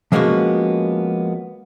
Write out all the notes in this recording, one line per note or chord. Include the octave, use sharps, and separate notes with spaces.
F3 G#3 A#3 B3 C#4 F#4